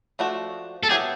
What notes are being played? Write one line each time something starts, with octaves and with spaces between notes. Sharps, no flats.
F3 A3 D4 F#4
A4
F#3 B3 E4 G4 G#4